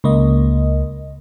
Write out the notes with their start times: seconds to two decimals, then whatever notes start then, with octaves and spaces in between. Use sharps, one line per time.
0.04 C#2 A#3 D#5